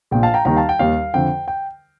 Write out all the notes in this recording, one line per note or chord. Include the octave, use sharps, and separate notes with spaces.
A#1 A#2 F3 G5
F5 A5
G5 A#5
D#2 D#3 G3 G5 A#5
F5 A5
G5
D#2 D#3 G3 F5
F2 D3 F3 G5
G5